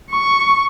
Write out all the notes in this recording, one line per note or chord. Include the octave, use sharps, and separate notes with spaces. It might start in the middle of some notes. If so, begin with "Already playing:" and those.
C#6